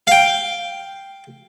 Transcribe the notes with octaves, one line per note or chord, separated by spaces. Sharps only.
F5 G5